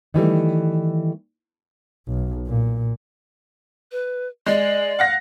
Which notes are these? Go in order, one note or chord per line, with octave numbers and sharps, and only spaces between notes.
D#3 E3 G3 A3
B1
A#2
B4
G#3 D5
F5 F#5 A#6